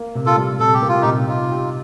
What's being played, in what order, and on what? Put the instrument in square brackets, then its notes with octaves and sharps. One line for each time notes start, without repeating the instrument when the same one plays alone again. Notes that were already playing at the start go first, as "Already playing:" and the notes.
Already playing: [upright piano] A#3
C3
[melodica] F4 A4
[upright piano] G3
[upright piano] C3 [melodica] A4
[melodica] G4
[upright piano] A#3
[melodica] F4
[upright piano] C3 [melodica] D#4 G4
[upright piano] D#4 [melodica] F4
[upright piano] G4